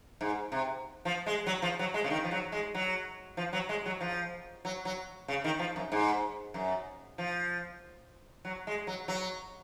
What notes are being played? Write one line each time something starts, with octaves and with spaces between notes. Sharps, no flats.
G#2
C3
F3
G#3
F#3
F3
F#3
G#3
C#3
D#3
F3
F#3
G#3
F#3
F3
F#3
G#3
F#3
F3
F#3
F#3
C#3
D#3
F3
F#2
G#2
F#2
F3
F#3
G#3
F#3
F#3